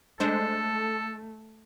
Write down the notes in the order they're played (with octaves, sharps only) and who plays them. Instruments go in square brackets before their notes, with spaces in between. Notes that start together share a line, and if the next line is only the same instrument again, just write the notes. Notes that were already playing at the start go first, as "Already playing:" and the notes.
[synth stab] G#3 D4 C5 [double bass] A3 [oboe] A4